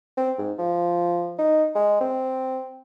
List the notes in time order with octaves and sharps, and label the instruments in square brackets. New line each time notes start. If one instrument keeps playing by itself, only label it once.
[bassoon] C4
G#2
F3
D#4
G#3
C4